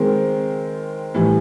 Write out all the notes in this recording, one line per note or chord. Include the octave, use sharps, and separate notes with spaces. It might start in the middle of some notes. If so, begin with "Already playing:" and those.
Already playing: D#3 G#3 C4
A2 E3 G3